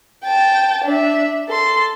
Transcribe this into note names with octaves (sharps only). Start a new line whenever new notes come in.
G5 A5
D4 E5
A4 C6